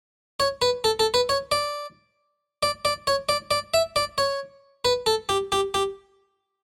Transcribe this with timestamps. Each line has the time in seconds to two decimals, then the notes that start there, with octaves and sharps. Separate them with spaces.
0.40 C#5
0.62 B4
0.84 A4
0.99 A4
1.14 B4
1.29 C#5
1.52 D5
2.63 D5
2.85 D5
3.07 C#5
3.29 D5
3.51 D5
3.74 E5
3.96 D5
4.18 C#5
4.85 B4
5.06 A4
5.29 G4
5.52 G4
5.74 G4